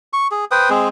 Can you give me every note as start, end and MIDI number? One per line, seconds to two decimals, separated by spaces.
0.13 0.27 85
0.31 0.45 68
0.51 0.69 71
0.51 0.69 72
0.51 0.69 79
0.51 0.69 87
0.70 0.89 56
0.70 0.89 60
0.70 0.89 68